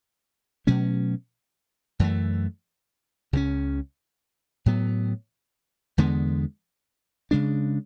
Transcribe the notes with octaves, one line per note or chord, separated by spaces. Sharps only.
B2 F#3 A3 C#4
F#2 E3 A3
C#2 C#3 G#3 C#4
A2 F#3 B3
E2 D3 G#3 B3
C#3 G#3 D4